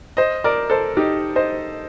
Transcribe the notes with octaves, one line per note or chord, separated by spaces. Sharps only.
C5 D#5
A#4 D5
A4 C5
D#4 G4
C5 D#5